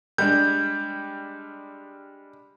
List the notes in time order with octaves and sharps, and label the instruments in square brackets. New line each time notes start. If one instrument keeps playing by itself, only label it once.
[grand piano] G3 G#3 D4 [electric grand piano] G6